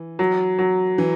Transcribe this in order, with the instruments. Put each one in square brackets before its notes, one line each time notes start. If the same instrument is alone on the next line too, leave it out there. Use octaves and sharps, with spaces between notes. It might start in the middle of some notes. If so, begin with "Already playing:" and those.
Already playing: [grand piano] E3
[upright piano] F#3
F#3
[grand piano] E3